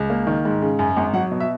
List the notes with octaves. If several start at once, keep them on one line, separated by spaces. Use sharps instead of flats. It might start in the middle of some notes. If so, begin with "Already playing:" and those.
Already playing: C#2
A#3
D#3
G#2
C#3
F#2
G#1
F#3 F#5
B2
E5